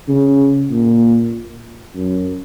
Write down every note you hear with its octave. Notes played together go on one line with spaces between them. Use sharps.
C#3
A#2
F#2